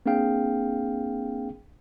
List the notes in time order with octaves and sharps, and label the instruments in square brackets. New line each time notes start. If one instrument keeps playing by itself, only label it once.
[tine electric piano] A#3 C4 D4 G#4 F5 G5